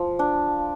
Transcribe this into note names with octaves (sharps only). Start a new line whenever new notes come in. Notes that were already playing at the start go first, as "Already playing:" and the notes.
Already playing: F3
D4